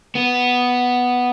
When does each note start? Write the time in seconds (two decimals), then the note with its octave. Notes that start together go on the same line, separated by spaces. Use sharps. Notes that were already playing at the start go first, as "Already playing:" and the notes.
0.15 B3